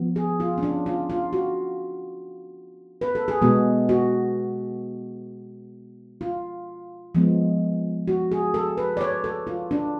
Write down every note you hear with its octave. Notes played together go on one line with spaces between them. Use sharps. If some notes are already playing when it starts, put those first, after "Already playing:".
Already playing: F3 B3
G#4
F4
C#4
D4
F4
F4
F#4
B4
A4
G#4
B2 G#3 B3 F#4
F#4
F4
F3 G#3 B3
F#4
G#4
A4
B4
D5
C#5
A4
F4
D4